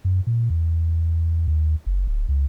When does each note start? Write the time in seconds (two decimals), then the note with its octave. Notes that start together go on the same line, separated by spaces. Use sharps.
0.05 F#2
0.27 A#2
0.50 E2
1.48 D#2
1.86 F#1
2.07 D1
2.29 C#2